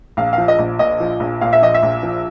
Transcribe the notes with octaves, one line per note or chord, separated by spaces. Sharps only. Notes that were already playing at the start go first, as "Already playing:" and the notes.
A#1 F5
F3 F5
D#5
A#1
A#2 D#5
F3
A#1
A#2 F5
E5
F3 D#5
E5
A#1
F3